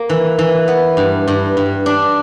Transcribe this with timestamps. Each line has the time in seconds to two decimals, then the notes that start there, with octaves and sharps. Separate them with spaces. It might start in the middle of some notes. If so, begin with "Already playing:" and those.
Already playing: A#3
0.09 E3
0.39 E3
0.68 B3
0.97 G2
1.28 G2
1.57 G2
1.86 D4